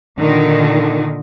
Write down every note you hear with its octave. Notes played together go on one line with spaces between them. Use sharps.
A#2 D3 D#3